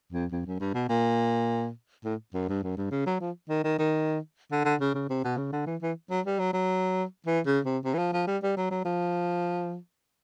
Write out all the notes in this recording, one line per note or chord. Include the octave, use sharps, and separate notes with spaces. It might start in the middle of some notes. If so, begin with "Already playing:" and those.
F2
F2
F#2
G2
B2
A#2
A2
F#2
G2
F#2
G2
C#3
F#3
F3
D#3
D#3
D#3
D3
D3
C#3
C#3
C3
B2
C#3
D3
E3
E3
F#3
G3
F#3
F#3
E3
C#3
C3
C3
E3
F3
F3
G3
G3
F#3
F#3
F3